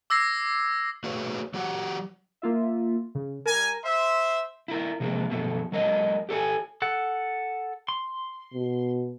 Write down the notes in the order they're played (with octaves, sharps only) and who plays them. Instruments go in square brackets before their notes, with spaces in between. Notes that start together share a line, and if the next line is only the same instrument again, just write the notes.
[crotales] D6 E6 G#6 A#6 C7
[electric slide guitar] A3 F#4 G#4 B4 C#5
F#3 F#4 G4 F#5
[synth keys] A#3 F4 E5
C#3
[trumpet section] G3 G#5 [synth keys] A#4 A#5
[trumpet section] C5 E5 [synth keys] C6
[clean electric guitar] E4 F4 A#4
C3 F3 G3 G#3 A#3
F#2 B2 F3 G#3 A3
F#3 G#3 A#4 C#5 D#5
G4 A4 C#5 G#5
[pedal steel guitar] A4 F#5
C6
[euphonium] B2